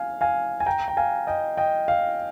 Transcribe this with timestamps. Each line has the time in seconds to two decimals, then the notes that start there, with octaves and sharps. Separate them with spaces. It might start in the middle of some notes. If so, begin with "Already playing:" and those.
Already playing: F5 G#5
0.21 F5 G#5
0.60 G#5
0.66 G5 A#5
0.88 G5
0.97 F5 G#5
1.27 D#5 G5
1.57 D#5 G5
1.88 F5